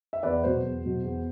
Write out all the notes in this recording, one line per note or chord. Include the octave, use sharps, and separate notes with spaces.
E5
E2 B4 D5
B2 F#3 C5
E2
B2 F#3
E2